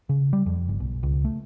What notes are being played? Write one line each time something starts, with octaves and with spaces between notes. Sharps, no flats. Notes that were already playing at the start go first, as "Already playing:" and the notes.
C#3
G3
F2
G1
B1
C#2
A3